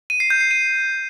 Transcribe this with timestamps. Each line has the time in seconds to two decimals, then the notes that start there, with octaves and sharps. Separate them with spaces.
0.10 D#7
0.20 C7
0.30 G6
0.41 C7
0.51 D#7